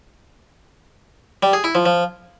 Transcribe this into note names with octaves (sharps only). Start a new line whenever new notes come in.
G3
G#4
E4
F3
F3